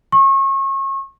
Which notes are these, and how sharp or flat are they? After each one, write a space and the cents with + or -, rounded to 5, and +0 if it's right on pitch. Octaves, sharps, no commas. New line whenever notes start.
C#6 -30